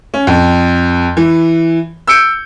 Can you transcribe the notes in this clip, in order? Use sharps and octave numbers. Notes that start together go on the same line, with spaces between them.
C#4
F2
E3
E6 G6 C#7 D7